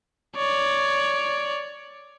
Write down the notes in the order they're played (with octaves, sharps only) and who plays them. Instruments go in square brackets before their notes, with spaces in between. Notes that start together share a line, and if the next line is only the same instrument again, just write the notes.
[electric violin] C#5 D5